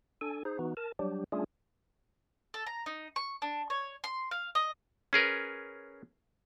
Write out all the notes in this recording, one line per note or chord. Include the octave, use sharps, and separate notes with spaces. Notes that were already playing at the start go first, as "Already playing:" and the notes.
D4 A4 G#5
D#4 G#4 C5
E3 B3 D#4 F#4
A#4 A5
F#3 G3 D4 G4
G3 A3 C#4 D4 F4 G#4
A4
A#5
D#4
C#6
D4
C#5
C6
F5
D#5
C#4 G#4 A#4 B4